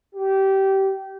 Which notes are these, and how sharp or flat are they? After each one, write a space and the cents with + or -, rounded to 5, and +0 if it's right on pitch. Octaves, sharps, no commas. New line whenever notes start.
G4 -20